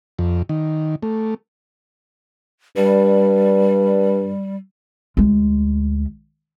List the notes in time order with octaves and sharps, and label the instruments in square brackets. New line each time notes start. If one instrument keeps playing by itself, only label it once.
[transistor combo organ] F2
D#3
A3
[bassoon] G2 [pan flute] G3
[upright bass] D2 G#3